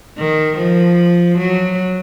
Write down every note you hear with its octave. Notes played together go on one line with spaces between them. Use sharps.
D#3
F3
F#3